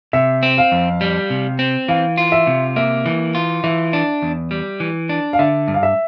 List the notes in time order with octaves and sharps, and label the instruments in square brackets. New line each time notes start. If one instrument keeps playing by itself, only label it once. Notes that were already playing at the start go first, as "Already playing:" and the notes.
[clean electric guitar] C3 [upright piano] E5
[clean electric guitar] C4
[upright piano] F5
[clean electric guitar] F2
G3
C3
C4
[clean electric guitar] E3 [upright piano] F5
[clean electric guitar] F4
[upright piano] E5
[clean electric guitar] C3
[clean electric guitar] A#3 [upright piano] E5
[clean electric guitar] E3
F4
[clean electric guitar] E3 [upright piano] E5
[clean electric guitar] D4
E2
G3
E3
D4
[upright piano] F5
[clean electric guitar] D3 [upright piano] E5
[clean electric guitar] G2
[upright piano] F5
E5